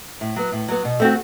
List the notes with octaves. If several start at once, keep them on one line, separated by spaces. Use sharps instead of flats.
A2
F#3 B3
A2
F#3 B3
B2
A3 C4 F#4